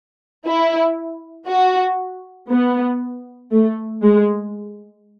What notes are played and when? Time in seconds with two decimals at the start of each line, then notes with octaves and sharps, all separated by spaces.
0.45 E4
1.47 F#4
2.50 B3
3.51 A3
4.03 G#3